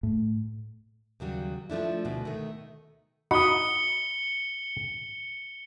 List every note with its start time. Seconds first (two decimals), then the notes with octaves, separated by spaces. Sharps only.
0.03 A2
1.20 D#2 C#3 F#3 G3
1.70 F3 A3 D4 E4
2.05 D2 B2
2.25 D#3 A3
3.31 D#4 F#4 B5 D#6 C#7 G7